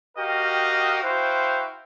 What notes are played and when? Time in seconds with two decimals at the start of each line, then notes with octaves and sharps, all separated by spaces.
0.18 F#4 G4 A#4 D#5 F5 G5
1.02 E4 F#4 C5 F5 G5 C6